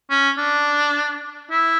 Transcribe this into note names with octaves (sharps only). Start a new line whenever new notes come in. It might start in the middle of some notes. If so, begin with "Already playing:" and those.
C#4
D4
E4